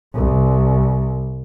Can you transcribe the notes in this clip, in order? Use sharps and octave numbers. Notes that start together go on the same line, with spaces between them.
C2